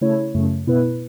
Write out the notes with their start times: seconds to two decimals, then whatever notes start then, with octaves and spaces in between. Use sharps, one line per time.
0.01 C#3 A3 E4 C#5
0.35 F#2 C#3 A3
0.67 B2 B3 E4 B4